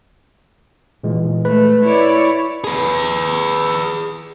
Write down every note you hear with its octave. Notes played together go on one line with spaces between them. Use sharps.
A#2 E3 G#3
A3 B4
E4 C#5 D5
G#4 B4